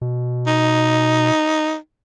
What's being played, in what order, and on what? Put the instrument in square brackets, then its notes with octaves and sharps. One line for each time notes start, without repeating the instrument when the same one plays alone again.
[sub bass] B2
[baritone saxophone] D#4